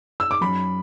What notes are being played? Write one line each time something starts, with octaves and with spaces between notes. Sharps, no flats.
E6
D6
F#2 B5